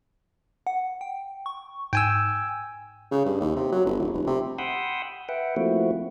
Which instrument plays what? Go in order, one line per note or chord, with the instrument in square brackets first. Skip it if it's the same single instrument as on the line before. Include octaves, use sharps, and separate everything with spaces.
[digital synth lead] F#5
G5
C#6
[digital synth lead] G#2 [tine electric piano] G5 G#5 E6
[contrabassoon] C#3
G2
D#2
C3
F#3
G1
D#1
F1
C3
[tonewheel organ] F#5 G5 B5 C6 D#6 E6
B4 E5 F#5 G5
F3 A3 A#3 C4 E4 F#4